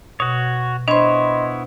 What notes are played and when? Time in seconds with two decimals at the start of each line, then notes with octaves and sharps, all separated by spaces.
0.20 B2 F#4 C#5
0.88 B3 D4 E4 C5 C#5 D#5 B5 C6